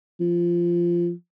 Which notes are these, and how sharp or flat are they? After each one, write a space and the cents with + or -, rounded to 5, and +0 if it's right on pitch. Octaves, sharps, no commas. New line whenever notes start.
F3 -15